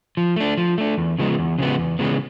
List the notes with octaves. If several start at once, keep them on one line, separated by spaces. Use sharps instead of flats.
F3
A3 D4
F3
A3 D4
E2
C#3 F3 G#3 B3
E2
C#3 F3 G#3 B3
E2
C#3 E3 G#3 B3